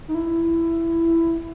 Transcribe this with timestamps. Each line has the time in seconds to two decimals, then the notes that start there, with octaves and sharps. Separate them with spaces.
0.08 D#4
0.15 E4